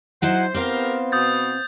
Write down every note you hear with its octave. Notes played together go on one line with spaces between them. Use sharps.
F#3 D#4 E4 C5 F#5
B3 C4 G4 A#4 C5 F5
B2 D#6 G6 A6